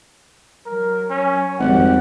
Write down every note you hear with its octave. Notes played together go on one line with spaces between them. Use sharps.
F#3 A#4
C#4
G#1 F2 G3 G4 F#5